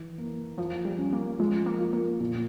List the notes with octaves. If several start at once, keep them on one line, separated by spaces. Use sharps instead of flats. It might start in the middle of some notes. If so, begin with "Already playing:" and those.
Already playing: E3
A#3
F3 F4
G3
C#4
A#3
F3 G#3
A#3
F4
A#3
A#2